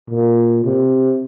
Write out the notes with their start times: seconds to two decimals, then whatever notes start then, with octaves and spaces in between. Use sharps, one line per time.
0.10 A#2
0.64 C3